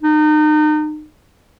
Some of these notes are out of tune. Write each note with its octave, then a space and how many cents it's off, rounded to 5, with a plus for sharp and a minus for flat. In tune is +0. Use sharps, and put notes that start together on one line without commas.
D#4 -35